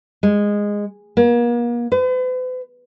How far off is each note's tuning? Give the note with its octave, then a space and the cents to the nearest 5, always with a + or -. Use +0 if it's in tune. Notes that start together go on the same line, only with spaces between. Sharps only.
G#3 -15
A#3 +40
B4 +45